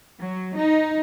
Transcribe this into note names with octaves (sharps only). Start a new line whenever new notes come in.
F#3
D#4